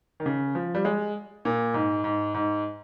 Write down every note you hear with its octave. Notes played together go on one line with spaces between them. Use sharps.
D#3
C#3
F3
G3
G#3
A#2
G#2
G#2
G#2